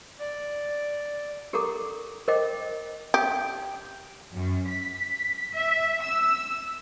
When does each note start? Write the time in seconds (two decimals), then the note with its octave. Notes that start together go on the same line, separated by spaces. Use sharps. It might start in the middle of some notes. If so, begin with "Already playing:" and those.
0.19 D5
1.53 G4 A4 A#4 F#5 A#5 D6
2.28 A#4 C5 D#5 G5 D6
3.14 G4
4.32 F#2
4.70 B6
5.54 E5
6.01 E6